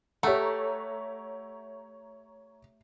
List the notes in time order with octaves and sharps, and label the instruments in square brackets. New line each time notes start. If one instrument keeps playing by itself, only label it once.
[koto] A3 [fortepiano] G4 E5 F#5 [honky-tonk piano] C#5 A#5